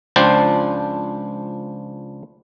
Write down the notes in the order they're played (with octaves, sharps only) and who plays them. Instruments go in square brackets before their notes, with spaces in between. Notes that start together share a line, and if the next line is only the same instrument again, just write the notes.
[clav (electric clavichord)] C#2 F3 D4 C5 G5 A5